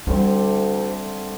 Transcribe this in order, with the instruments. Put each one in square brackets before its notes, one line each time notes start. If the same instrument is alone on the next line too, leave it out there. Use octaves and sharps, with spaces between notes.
[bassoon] D2 [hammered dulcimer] D3 A3 C4 [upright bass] G3